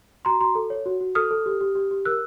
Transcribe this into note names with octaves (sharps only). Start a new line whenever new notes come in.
F#4 A#5 C6
F#4 A#5 C6
A4
C#5
F#4
F#4
A4 D#6 F6
A4
G4
G4
G4
G4
A#4 E6 F#6